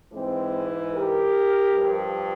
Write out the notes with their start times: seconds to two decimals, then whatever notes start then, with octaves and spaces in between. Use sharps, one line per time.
0.12 G#2 E3 G#3 C4
0.93 G4 A#4
1.73 G2 F3